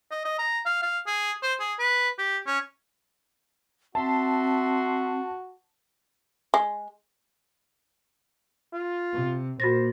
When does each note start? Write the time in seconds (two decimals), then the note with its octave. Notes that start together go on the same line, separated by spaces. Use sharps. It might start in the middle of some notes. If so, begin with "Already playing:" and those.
0.11 D#5
0.25 D#5
0.38 A#5
0.66 F5
0.82 F5
1.07 G#4
1.43 C5
1.60 G#4
1.79 B4
2.18 G4
2.47 C#4
3.95 C4 F#4 E5 A5 C6
6.54 G#3
8.73 F4
9.13 C3
9.60 A#2 A#3 F#4 C5 A6 A#6